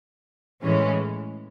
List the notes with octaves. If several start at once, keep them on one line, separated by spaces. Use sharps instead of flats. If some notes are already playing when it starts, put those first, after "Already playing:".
A2 E3 G#3 C#4